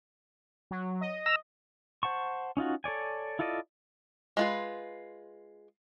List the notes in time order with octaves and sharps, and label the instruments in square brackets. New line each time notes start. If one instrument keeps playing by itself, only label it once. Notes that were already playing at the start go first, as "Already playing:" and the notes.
[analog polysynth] F#3
D#5
[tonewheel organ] A#5 E6
[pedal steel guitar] C5 F#5 A5 C#6
C#4 D#4 F4 F#4
A4 C#5 D5 G#5
E4 F4 A4 D5 D#5
[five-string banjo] G#3 F4 B4